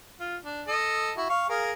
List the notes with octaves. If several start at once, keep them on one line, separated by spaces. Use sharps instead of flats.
F4
D4
A4 D#5
E4 F#4
F5 C#6
G#4 A#4 F5